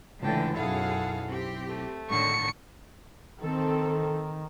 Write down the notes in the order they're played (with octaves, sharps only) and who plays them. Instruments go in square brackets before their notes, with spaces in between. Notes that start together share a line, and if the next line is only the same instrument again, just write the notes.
[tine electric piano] C#2 [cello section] A2 D3 E3 [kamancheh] G5 A5
[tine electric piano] B1 E4 [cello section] F#2 G#4 F5 [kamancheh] A4 F#5
[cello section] C4 G4
[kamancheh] A3
[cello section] A2 D3 D#3 [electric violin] C#6 C#7
[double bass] D#3 [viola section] C4 A4